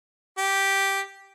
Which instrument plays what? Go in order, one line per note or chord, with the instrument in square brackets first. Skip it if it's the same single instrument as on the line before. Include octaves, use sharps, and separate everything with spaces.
[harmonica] G4